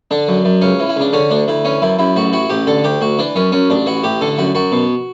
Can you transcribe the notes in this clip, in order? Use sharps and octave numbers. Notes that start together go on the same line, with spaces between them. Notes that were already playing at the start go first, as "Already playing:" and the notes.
D3 D4
F#2
F#2
C#2 C#4
E3
E4
C#2 D4
D3 C#4
D2 D4
D2 E4
E3 C#4
F#2 E4
F#2 E4
A1 F#4
E3 F#4
A1 G4
D3 A4
D2 G4
D2 F#4
E3 D4
F#2 C#4
F#2 C#4
A1 D4
E3 F#4
A1 G4
D3 A4
F#2 F#4
F#2 F#4
B2